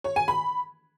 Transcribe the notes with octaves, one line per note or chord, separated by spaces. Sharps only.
C#5
G#5
B5